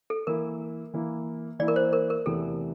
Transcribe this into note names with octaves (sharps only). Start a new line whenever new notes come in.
A4
E3 A#3 E4 A#4
E3 A#3 E4
E3 A#3 E4 D5
A#4
C5
A#4
A#4
E2 C3 E3 A3 E4 A4